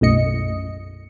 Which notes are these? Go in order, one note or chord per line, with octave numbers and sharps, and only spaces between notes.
B1 F#2 A2 D#5 C#7